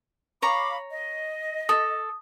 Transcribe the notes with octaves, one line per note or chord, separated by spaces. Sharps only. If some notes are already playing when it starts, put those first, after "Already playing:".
C#5 F5 A#5 B5 D6
D#5
A4 D#6